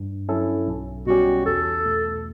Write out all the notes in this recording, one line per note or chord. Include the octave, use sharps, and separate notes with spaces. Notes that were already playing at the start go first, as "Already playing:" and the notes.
Already playing: G2
F#3 C#4 E4 A4
B1
B2 G3 C#4 F#4 G4
E2 A4
B2 A3